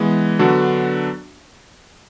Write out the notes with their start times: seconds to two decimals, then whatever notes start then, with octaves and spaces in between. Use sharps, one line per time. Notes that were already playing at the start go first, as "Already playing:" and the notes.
Already playing: E3 G#3 B3
0.39 D3 F#3 B3 D4 F#4